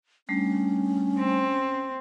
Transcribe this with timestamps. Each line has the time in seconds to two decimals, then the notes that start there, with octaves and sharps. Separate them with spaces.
0.29 G3 A3 C#4 D4
1.18 C4